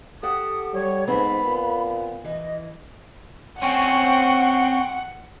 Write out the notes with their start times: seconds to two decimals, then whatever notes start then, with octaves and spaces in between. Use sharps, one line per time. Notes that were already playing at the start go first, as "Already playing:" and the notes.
0.23 G4 A4 F#5 D#6
0.74 G3 C#5
1.08 G#2 B3 C4 B4 B5
1.45 A#2
2.25 E3 D#5
3.62 C4 C#4 F#5 G5 C6 C#6